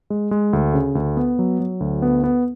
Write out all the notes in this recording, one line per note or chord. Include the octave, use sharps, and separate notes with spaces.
G#3
G#3
D2
C#3
D2
B3
F#3
F#3
D2
B3
B3